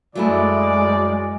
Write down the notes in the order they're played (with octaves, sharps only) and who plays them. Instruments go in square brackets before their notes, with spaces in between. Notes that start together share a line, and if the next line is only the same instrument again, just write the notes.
[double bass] F#2 G#3 [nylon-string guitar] F#3 A3 E4 [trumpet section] D5